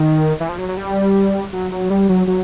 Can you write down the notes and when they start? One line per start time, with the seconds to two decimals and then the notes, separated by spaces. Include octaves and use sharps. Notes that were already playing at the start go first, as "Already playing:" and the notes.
Already playing: D#3
0.40 E3
0.49 F3
0.58 F#3
0.69 F#3
0.77 G3
1.53 F#3
1.72 F#3
1.90 G3
2.09 F#3
2.27 F#3